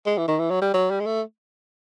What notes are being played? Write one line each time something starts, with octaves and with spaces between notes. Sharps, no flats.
G#3
E3
D#3
E3
F#3
G3
F#3
G3
G#3
A3